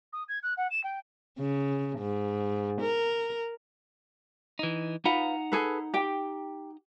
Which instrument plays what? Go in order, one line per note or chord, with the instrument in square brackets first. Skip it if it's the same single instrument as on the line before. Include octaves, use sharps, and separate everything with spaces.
[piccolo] D#6
G#6
F#6
F#5
E7
G5
[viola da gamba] C#3
G#2
A#4
[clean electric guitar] E3 D#4
[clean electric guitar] D#4 F#5 A#5 [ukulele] F4 B4
[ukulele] G#4 A4 B4
G4 G5